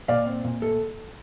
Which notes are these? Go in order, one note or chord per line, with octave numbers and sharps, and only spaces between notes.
A#2 D5 F5
C4
A#2
A3 A4